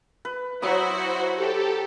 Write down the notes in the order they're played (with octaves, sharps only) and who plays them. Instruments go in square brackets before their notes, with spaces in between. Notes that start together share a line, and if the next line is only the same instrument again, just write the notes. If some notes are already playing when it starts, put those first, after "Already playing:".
[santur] B4
[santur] F#3 B5 D#6 [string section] E4 F#4 C5
[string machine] G4 A4